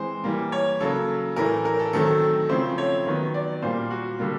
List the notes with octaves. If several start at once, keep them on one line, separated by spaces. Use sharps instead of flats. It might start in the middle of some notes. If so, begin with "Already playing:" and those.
Already playing: E3 G#3 C4 C5
E3 G3 A#3
C#5
C#3 F#3 A#3 A4
A2 E3 A3 A#4
A#4
A4
D#3 F#3 A3 C4 A4
C#3 F3 A3 C4 C5
C#5
D#3 F#3 B3
D5
A#2 G3 A#3 C5
F#4
D3 G3 A#3